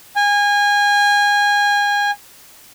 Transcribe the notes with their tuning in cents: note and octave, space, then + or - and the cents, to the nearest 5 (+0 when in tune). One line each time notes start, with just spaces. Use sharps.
G#5 -25